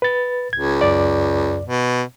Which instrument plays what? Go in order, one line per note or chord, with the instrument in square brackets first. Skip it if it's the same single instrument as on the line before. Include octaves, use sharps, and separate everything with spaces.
[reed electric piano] B4 A6
[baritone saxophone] C#2 [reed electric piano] G#6
[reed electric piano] F#2 D5
[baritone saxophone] B2